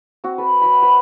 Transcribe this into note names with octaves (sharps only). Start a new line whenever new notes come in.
C4 F#4
A4 B4
F#3 F#4 B5
B4 C5